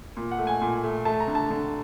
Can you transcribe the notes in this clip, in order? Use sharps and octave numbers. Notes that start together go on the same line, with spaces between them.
A#2
F#5
A3
G#5
A#2
A3
A3 A5
A#5
D3
A5
D3